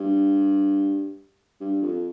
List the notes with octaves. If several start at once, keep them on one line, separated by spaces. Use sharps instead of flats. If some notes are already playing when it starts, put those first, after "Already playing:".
Already playing: G2
G2
F2